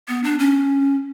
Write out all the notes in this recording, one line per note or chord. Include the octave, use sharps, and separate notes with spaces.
B3
D4
C#4